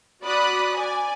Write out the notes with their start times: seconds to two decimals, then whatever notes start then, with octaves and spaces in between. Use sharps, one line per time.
0.24 F#4 D5 B5 D#6 F#6
0.77 D5 G#5